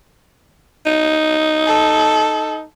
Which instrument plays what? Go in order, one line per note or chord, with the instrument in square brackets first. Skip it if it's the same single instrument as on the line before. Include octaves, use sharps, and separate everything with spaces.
[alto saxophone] D#4
[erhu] A4